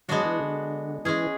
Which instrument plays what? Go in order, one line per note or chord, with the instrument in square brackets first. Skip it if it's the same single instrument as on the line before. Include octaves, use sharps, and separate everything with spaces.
[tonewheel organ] F#3 [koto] G#3 B3 D4 F#4
[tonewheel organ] E3
D3
[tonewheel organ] E3 [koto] G#3 C#4 G#4